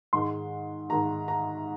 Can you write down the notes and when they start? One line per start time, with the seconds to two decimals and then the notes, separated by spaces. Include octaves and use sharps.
0.13 G#2 D#3 G#3 C6
0.89 G#2 D#3 G#3 A#5
1.28 A#5